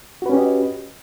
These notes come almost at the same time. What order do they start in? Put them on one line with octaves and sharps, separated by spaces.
F#4 B4 C#4 G4 D#5